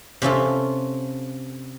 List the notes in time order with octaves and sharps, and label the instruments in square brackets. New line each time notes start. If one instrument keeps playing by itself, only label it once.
[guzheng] C3 C#4 F4 A4